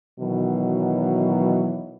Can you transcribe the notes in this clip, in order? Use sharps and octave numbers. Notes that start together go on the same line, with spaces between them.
B2 D#3 E3 F#3